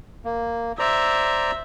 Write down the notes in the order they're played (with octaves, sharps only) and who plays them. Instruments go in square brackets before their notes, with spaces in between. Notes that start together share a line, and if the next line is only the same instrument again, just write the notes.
[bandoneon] A#3
[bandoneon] C5 D5 A#5 [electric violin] E5